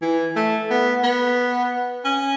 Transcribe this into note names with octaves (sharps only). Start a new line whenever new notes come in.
E3
A3
B3
B3
C#4